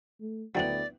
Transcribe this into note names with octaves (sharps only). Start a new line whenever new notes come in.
A3
D2 F#3 B3 C4 D4 E4 D5 G5